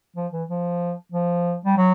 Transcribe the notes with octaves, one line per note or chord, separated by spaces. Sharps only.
F3
E3
F3
F3
G3
F#3